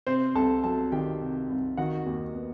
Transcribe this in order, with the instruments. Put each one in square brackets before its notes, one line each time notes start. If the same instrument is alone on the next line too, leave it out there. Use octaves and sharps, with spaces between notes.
[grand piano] C3 C4 C5
C2 A4 A5
F#3 A4 A5
D#3 G4 G5
C3
C2
D#3 F#4 F#5
D#2
B3